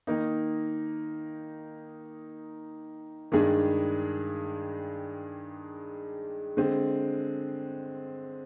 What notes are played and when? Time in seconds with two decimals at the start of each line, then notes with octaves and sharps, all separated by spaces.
0.07 D#3 A#3 D#4
3.32 G2 D#3 G#3 D4 G#4
6.57 D3 G#3 C4